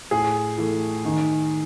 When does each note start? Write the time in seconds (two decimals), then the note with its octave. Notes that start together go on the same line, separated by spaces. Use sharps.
0.11 A2 G#4
0.58 E3 A3
1.05 D#3